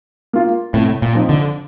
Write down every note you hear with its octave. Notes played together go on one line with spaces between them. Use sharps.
A#3 F4
A2 C3
A#2
F3 C4 D#4
D3